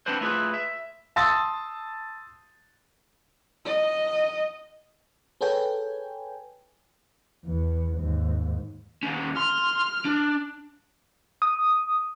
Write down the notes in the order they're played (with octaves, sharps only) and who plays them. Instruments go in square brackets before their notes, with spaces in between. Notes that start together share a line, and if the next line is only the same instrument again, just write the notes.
[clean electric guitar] B3 C4 D4 E4 B4 C5
A3 E4 F4 G#4 B4
E5
[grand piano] A5 C6 D#6 E6 A6
[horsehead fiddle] D#5
[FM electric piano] G#4 A4 B4 C#5 G5 G#5
[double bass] E2 B3
D#2 G#2
[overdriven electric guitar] D#2 C#4
[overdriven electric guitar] C6 [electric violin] F6
[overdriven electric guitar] D4
[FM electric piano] D#6